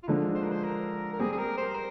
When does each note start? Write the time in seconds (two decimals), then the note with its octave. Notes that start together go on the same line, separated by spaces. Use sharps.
0.03 F4
0.08 D3 F3 G#3 D4 D#4
0.35 C5
0.44 A#4
0.52 C5
0.64 A#4
1.13 A#4
1.20 G3 C4 G4 G#4
1.32 G#4
1.38 A#4
1.58 C5
1.75 A#4